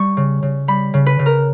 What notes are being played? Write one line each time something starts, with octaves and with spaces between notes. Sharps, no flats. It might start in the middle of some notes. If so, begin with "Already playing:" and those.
Already playing: G3 C#6
C#3
C#3
G3 B5
C#3
B4
C#3
A#4